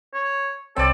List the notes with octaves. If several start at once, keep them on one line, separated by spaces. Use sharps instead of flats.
C#5
C2 C4 A4 C#5 D5